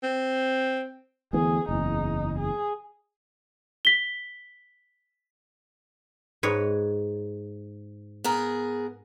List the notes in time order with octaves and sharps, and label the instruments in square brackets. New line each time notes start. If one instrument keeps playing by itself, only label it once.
[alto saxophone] C4
[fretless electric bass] D2 E3 B3 [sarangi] G#4
[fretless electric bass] F#1 E2 [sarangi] D#4
[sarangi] G#4
[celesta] B6 G7
[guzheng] G#2 B4 C#5
[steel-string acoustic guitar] B3 G#4 A#4